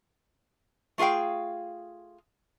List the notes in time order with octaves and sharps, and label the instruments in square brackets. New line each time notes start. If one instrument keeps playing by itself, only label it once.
[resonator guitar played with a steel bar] A3 F4 G#4 F5 G5